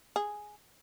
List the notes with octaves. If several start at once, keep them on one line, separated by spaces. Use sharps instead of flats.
G#4